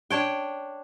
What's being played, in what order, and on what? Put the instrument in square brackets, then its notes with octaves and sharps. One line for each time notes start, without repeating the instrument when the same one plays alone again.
[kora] D4 C#5 G5